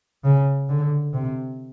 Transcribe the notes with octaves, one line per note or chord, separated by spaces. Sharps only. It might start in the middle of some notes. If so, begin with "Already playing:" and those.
C#3
D3
C3